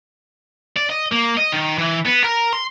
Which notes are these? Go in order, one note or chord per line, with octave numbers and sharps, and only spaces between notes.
D5
D#5
A#3
D#5
D#3
E3
B3
A#4
C6